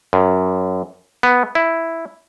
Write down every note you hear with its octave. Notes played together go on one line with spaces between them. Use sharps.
F#2
B3
E4